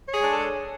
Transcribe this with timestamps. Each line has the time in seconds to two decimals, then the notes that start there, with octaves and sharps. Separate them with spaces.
0.09 C#5
0.14 G#4
0.18 G#3
0.23 D4
0.28 A4